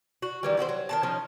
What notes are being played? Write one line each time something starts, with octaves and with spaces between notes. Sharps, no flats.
F#4
D#3 E3 G3
E4 F#4 G4 C5
F#3
D#3 E3 A5
D#3 F3 C#4 D#4